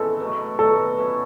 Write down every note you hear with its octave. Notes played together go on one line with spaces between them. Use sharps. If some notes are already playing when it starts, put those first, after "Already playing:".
Already playing: C#3 E3 G#3 B3 E4 A4
B2 F#3 A3
B2 F#3 A3 A4
B2 F#3 C#4 E4